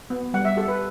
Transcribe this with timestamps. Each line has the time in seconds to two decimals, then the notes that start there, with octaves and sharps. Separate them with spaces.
0.10 B3
0.34 G3 F#5
0.45 E5
0.57 G4 A4
0.68 B4